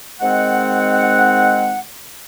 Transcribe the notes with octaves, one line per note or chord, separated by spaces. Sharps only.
G#2 D#3 G#3 C4 F#5